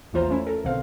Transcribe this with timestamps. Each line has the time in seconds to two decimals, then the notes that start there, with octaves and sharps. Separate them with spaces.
0.13 A#1 E2 E3 F4 C5 A#5
0.28 E3 A3 C#4 E4
0.47 A4 A#4
0.65 B1 B2 D3 C4 F5